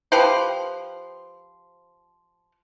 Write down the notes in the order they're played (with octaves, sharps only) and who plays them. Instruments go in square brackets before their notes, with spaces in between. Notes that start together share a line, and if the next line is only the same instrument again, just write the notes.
[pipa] F3 G4 B4 C5